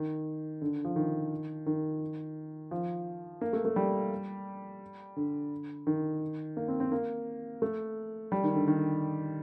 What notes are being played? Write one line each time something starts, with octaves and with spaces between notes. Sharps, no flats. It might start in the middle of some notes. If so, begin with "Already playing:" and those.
Already playing: D#3
D3
F3
D#3
D#3
F3
A#3
A3
A3
G3
D3
D#3
A#3
C4
C4
A#3
A3
G3
D#3
D3
D#3